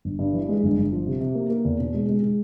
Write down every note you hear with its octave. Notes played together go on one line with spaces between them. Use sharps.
G1
G2
E3
G#3
G1
G1
F3
C3
C3
A#3
A#3
E2
B2
G#3
G#3
G#3